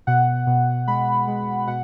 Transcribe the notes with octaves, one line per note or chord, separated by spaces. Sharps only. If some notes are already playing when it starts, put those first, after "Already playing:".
B2 F#5
B2
G#3 B5
G#3
B2 F#5